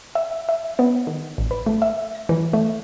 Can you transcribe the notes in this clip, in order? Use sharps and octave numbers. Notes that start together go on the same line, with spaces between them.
E5
E5
B3
D#3
A1
B4
A3
E5
A#6
E3
A3